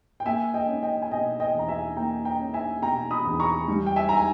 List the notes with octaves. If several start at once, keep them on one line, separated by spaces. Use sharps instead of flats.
G5
A#3 E5 G#5
D#5 G5
C#4
D#5 G5
G#5
B2 D#5 G5
D#5 G5
E2 A#5
E5 G#5
A#3 G5 A#5
G5 A#5
C#4
E5 G#5
B2 G5 A#5
B5 D#6
E2
A#5 C#6
G3
G5
E5 G#5
A#5
G#5